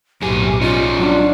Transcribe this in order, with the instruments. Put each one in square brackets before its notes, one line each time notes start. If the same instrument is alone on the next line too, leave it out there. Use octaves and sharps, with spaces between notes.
[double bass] B1 A2 [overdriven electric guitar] F#2 G#4 [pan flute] G4
[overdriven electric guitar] C#4 D#4 [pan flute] F4
[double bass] F#3 D4